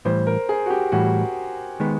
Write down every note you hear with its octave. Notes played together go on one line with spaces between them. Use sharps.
A2 E3 G3 C5
A#4
G#4
F#4
G4
A2 E3 G3 F#4
D#3 G#3 B3